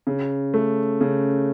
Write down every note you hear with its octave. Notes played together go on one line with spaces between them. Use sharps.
C#3
A3
C#3